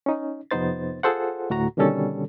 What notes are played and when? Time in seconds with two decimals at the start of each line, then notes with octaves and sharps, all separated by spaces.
0.06 C#4 D#4
0.51 F2 C3 B3 D#4 C5 A6
1.03 F4 G#4 A4 C5 F#5
1.50 D2 A2 F#4 A#5
1.77 B2 D3 D#3 G3 C#4 A4